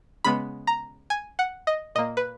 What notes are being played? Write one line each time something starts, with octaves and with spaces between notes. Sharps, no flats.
C#3 G#3 B3 B5
A#5
G#5
F#5
D#5
A#2 A#3 D#5
B4